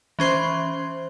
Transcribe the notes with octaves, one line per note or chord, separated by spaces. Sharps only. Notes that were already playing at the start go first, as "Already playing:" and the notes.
E3 C#4 C5 C6